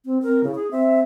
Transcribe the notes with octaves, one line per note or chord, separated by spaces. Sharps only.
C4
C4 A#4
C#3 E4
G#4
C4 E5